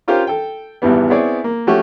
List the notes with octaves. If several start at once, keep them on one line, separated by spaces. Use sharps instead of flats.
C#4 F4 G4 A#4 C5 F5
A4 G5
G#1 E2 E3 G3 B3
B3 C4 E4 G#4 C#5 D5
A#3
F3 A3 C#4 F#4 G4